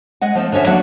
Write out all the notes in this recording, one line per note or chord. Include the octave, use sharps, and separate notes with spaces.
G#3 D#5 F#5
F3 A3 C4
D3 F3 C#4 C#5 E5
D#2 F#3 A#3 D4 F#5